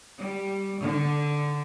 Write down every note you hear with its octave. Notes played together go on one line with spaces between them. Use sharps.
G3
D3